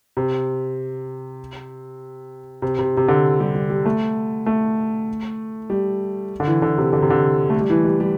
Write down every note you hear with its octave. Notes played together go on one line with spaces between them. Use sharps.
C3
C3
C3
C3
D3
G3
G3
G3
A3
A3
G3
D3
E3
D3
C3
D3
C3
D3
A3
G3
E3
G3
G3